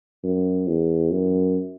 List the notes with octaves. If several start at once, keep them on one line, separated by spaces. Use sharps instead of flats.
F#2
E2
F#2